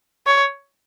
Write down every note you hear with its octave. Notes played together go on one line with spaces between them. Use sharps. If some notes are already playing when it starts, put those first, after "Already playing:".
C#5